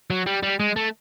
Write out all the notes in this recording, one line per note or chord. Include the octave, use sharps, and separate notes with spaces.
F#3
G3
G3
G#3
A3